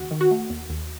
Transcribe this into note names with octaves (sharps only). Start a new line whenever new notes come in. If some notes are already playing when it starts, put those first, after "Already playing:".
Already playing: D#2 C#3 F#4
D#3
F#4
A3
D#2
D#2